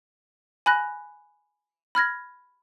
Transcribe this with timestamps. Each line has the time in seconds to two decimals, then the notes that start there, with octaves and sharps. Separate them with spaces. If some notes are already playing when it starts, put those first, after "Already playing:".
0.66 G#5 B5 F#6 A#6
1.95 B5 F6 G#6 A#6